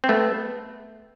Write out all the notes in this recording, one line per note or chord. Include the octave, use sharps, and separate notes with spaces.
C4
A3 B3